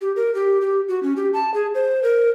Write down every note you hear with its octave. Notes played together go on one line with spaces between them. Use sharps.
G4
A#4
G4
G4
F#4
C#4
G4
A5
G#4
C5
A#4